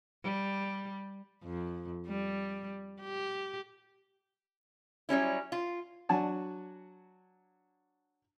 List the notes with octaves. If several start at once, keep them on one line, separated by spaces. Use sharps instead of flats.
G3
F2
G3
G4
F#3 G3 C#4 E4
F4
F#3 D4 F#4 G#5 A5